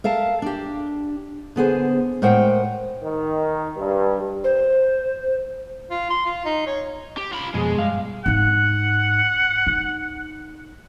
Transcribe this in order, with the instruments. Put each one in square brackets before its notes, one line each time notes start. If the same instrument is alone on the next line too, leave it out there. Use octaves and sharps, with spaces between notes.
[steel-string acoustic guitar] A#4 E5 F5 A5
D4 G4
D3 B3 G#4 C5
A2 G#3 A#4 C5 F#5 G5
[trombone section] D#3
G2
[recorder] C5
[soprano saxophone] F4
C6
F4
D#4
C#5
[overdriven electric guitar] G4
F4 B5
[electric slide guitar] F2 B2 G#4 [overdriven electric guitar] G#3
[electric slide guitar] G2 F5
[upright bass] G#2 D#4 [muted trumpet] F#5
[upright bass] D#4